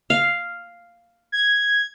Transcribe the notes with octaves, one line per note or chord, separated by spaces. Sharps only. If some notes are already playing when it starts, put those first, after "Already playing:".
F5
G#6